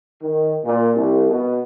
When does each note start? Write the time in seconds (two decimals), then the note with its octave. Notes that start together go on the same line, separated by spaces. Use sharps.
0.21 D#3
0.64 A#2
0.95 C2
1.29 B2